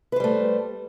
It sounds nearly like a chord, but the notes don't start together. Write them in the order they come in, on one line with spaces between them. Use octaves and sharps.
B4 C5 G3 A3